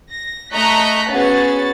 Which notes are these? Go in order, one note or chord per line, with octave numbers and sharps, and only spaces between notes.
A#6
A3 D#5 A#5 C#6 F#6 B6
B3 C#4 F#4 G#4 A6